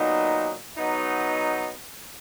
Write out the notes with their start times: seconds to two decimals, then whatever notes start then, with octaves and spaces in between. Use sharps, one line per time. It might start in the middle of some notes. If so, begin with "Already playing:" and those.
Already playing: A#2 F#3 B3 D#4
0.78 F#3 B3 D#4